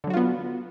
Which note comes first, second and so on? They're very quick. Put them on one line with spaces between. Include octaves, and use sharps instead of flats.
D3 F#3 F#4 F4 B3